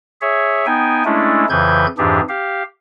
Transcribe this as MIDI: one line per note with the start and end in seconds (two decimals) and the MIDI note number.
0.21 0.66 68
0.21 0.66 73
0.21 0.66 76
0.66 1.03 59
0.66 1.03 63
0.66 1.03 79
0.66 1.03 80
1.05 1.45 56
1.05 1.45 57
1.05 1.45 61
1.05 1.45 62
1.05 1.45 64
1.50 1.86 41
1.50 1.86 49
1.50 1.86 52
1.50 1.86 71
1.50 1.86 91
1.50 1.86 92
1.98 2.21 41
1.98 2.21 44
1.98 2.21 52
1.98 2.21 62
1.98 2.21 67
1.98 2.21 68
2.29 2.63 67
2.29 2.63 77